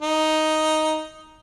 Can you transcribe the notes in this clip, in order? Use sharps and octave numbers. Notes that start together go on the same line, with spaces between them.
D#4